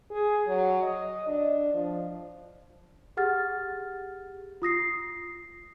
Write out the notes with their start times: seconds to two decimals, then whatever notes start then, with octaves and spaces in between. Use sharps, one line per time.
0.10 G#4
0.47 F#3
0.82 D#5
1.27 D4
1.74 F3
3.17 G4 G#4 F#5 F6 A6
4.62 F4 D#6 A#6 C7